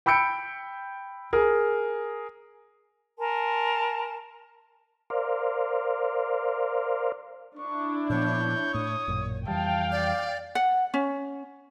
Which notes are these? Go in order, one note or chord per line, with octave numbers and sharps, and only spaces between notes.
G5 B5 E6 G6 C#7 D7
G#4 A#4
A#4 G#5 A5 C6
A#4 C5 D5 F5
D4 E4 C#6
A#2 F3 B3 C#5 G6
A2 D#6
A1 F#2 A#2
F2 E3 G3 F5 G5 A5
D5 D6
F#5
C#4